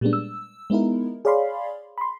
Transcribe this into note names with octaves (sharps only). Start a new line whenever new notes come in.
A#2 G3 G#3 A#3 B3 D4
E6
G#3 B3 D#4 E4 A#4
G#4 C#5 D5 F5 B5 C6
B5 C6